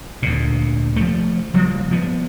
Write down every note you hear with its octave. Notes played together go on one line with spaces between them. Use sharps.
D2 A#2
F3 A3
F#1 F3 G3 A#3
F3 B3